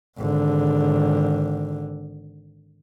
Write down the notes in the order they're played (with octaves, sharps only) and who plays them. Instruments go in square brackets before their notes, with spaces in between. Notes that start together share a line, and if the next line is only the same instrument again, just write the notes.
[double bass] G#1 D3